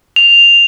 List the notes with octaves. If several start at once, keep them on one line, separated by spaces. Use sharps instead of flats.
F7